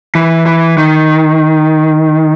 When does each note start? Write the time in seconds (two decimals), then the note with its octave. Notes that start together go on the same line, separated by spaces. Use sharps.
0.15 E3
0.46 E3
0.78 D#3